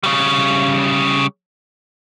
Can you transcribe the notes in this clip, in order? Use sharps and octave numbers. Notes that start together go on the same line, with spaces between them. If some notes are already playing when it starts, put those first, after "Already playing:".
C#3 G3